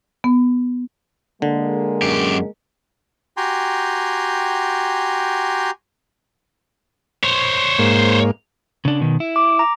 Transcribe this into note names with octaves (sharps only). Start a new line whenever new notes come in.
B3
D3 G#3 A#3
F#2 G4
F#4 G4 G5 G#5 A#5 C6
C5 C#5
G#2 A#3
C#3 D4
B2 D#3
E4
D6
A#5